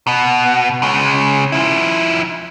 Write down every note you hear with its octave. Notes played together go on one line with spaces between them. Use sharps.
B2
C#3 G#3
F3 E4